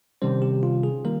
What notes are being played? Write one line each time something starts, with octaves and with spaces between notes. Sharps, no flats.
C3 D#3 G3 C#4 C5
G4
F4
G#4
D#3 G3 A#3 A#4